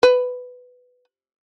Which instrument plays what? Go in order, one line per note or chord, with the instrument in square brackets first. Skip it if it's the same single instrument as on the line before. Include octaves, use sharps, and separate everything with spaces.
[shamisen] B4